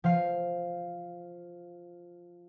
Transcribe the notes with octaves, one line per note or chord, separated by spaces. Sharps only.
F3 F5